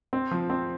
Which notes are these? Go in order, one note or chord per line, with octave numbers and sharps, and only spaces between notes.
C4
F3
C4